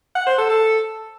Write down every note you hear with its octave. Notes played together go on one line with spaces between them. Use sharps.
F#5
C5
A4
A4